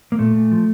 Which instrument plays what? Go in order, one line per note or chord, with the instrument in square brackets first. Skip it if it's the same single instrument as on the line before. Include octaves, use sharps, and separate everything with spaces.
[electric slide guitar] A#3
A#2 A3
A#2
F3